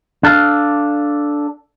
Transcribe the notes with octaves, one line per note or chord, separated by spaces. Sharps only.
D4 A4 F5